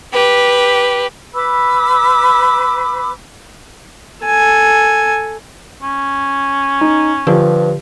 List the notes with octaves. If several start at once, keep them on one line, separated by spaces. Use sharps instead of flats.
G4 B4
B4 B5 D6 E6
A4 G#5
C#4
D#4
G2 D3 F3 G4